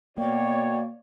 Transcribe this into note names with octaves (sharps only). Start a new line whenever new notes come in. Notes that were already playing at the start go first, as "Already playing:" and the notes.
B2 A#3 C#5 D5 G5